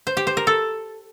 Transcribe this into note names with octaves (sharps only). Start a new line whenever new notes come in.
C5
G4
C5
A#4
A4